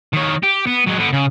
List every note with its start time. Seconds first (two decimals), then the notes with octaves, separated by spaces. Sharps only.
0.13 D#3 C#5
0.43 G4
0.67 B3
0.87 F#3 G#3
1.00 D3 B3
1.13 C#3